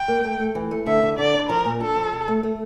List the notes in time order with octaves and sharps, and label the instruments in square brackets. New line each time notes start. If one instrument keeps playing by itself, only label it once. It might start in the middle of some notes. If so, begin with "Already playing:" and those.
Already playing: [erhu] G5
[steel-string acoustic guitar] A#3
A3
A3
E3
A3
[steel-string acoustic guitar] D3 [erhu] E5
[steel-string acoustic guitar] D3
[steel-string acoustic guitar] D3 [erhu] D5
[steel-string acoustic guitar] D4
[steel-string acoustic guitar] F3 [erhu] A#4
[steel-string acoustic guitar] A#2
[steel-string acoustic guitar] D4 [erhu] A4
[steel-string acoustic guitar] F3
C3
A3
A3